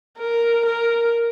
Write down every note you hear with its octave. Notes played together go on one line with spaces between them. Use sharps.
A#4
A#4